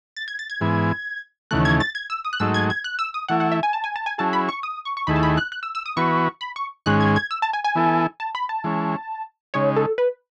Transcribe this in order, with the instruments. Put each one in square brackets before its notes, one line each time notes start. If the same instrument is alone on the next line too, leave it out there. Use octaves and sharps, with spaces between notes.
[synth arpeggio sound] A6
G#6
A6
G#6
[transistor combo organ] G#2 E3 B3
[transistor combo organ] D#2 C#3 E3 A3 [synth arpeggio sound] F#6
[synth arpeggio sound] G#6
A6
G#6
E6
D#6
F#6
[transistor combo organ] G#2 F#3 A3 D#4 [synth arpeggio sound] E6
[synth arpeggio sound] G#6
G#6
F#6
E6
D#6
[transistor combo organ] E3 A3 E4 [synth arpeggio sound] F#5
[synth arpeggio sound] F#5
E5
G#5
A5
G#5
A5
G#5
[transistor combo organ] F#3 C#4 E4 G#4 [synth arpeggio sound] A5
[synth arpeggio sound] B5
C#6
D#6
C#6
C#6
[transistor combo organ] D#2 D#3 A3 E4 G#4 [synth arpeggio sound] B5
[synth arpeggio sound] A5
B5
F#6
F#6
E6
E6
D#6
[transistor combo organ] E3 B3 F#4 B4 [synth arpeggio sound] C#6
[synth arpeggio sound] B5
C#6
[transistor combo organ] G#2 D#3 G#3 C#4 [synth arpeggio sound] F#6
[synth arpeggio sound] G#6
G#6
E6
A5
G#5
G#5
[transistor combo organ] E3 B3 E4 A4
[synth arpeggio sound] A5
B5
A5
[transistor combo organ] E3 G#3 C#4
[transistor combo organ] C#3 G#3 D#4 [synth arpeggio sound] C#5
[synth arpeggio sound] A4
B4